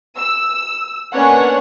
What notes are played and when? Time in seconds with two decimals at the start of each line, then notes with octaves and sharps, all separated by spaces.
0.17 E6
1.13 A#3 B3 C#4 D4 C#5 F#5